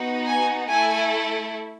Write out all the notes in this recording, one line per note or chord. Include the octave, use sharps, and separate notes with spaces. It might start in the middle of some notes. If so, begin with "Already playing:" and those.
Already playing: B3 D#4 F#4
G#5
A3 E4 A4 G#5